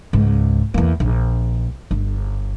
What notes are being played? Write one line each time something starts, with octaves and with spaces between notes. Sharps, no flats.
C#2 G#2
E2 A#3
A#1
G1